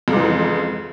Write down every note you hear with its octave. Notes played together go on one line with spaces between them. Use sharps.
F2 G#2 C#3 E3